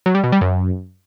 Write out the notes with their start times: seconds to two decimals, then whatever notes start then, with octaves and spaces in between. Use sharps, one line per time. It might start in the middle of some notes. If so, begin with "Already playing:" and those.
0.06 F#3
0.15 G3
0.24 B2
0.32 G3
0.41 F#2